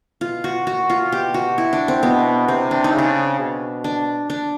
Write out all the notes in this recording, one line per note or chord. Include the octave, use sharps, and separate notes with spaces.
B2 F4
F#4
A#2 F#4
F4
B2 G4
F#4
E4
D4
C4
B2 B3
C3 C4
D4
D#4
C#3 D4
B2
D4
D4